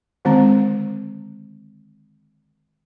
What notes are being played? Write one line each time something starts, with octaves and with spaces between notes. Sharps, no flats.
D3 D#3 G#3 C4 A#5